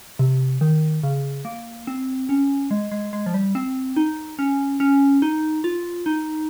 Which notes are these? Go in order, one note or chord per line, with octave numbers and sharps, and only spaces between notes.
C3
D#3
C#3
A#3
C4
C#4
G#3
G#3
G#3
F3
G3
C4
D#4
C#4
C#4
D#4
F4
D#4